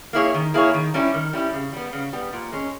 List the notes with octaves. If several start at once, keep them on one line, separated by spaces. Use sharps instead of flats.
A#3 E4 G#4 C#5
D#3
A#3 E4 G#4 C#5
D#3
G3 C#4 E4 G4
D#3
G3 C#4 E4 G4
C#3
G3 B3
C#3
G3 B3
A#2
G#3 C#4